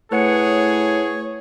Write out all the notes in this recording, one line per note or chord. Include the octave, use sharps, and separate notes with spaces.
A2 G#4 B4 C#5 F#5 C#7